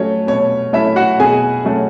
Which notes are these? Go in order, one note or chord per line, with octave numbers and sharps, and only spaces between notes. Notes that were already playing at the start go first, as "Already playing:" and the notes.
Already playing: F#3 A3 C#4 C#5
B2 C#5
F#3 A3 C#4 E4 E5
F#4 F#5
B2 G#4 G#5
F#3 A3 C#4